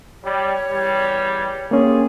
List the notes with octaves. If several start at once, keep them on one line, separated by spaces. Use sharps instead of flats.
G3 C#5
E2 G3
A#3 C#4 F4 G4 G#4